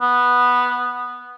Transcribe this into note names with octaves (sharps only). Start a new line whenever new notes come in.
B3